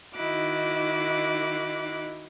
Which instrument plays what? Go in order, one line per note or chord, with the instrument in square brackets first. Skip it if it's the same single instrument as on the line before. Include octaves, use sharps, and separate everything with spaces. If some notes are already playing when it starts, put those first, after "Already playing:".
[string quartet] D#3 D#4 E4 F#4 D6 F#6